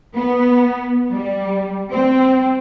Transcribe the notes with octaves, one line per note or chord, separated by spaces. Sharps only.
B3
G3
C4